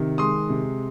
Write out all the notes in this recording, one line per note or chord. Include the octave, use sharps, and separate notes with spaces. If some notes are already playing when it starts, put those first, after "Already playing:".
Already playing: C3 D#3
G#3 C6 D#6
C3